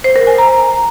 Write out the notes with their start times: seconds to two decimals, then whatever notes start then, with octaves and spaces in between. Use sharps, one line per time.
0.04 C5
0.16 A#4
0.27 G#5
0.38 A#5